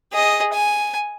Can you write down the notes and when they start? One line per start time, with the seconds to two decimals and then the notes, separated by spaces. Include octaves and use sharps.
0.12 G#4 D#5
0.53 G#5